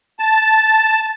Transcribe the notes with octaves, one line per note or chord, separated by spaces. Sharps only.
A5